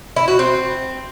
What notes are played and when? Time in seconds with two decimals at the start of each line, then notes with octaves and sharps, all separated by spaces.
0.16 E4
0.28 F#4
0.39 C4